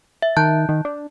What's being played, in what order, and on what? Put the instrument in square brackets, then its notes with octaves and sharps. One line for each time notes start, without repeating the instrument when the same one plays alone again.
[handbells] E5
[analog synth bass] D#3 [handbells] A5 F#6 G6
[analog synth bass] D#3
D4